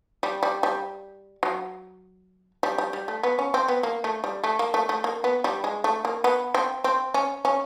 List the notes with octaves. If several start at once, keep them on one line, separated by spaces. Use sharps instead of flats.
G3
G3
G3
F#3
G3
G3
G3
A3
B3
C#4
C4
B3
A#3
A3
G3
A3
A#3
A3
A3
A#3
B3
G3
G#3
A3
A#3
B3
C4
C4
C#4
C#4